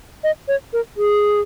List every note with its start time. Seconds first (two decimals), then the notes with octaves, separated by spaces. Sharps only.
0.24 D#5
0.48 C#5
0.73 A#4
0.97 G#4